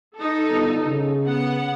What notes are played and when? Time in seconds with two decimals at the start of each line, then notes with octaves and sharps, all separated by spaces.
0.16 D#4 A4
0.48 G1
0.86 C#3
1.24 B3 F#5